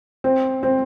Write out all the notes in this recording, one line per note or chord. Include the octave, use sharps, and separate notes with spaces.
C4
C4